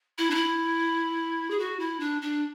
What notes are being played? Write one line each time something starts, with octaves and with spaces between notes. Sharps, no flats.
E4
D4
E4
G#4
F#4
E4
D4
D4